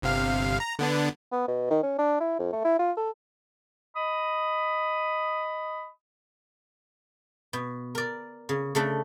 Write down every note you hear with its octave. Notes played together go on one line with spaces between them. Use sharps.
G1 C3 F5
A#5
D3 B3 D4
B3
B2
D#3
C#4
D4
E4
F2
A3
E4
F4
A4
D#5 B5 D#6
B2
A#4 D5
C#3
C#3 A3 D4